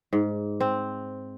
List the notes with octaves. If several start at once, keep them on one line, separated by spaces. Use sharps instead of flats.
G#2
C4